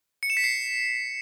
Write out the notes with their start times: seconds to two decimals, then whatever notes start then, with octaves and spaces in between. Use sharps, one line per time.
0.23 C#7
0.30 E7
0.37 B6
0.44 C7